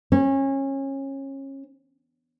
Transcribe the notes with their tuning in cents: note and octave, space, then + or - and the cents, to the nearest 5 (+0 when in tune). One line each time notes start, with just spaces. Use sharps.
C#4 -25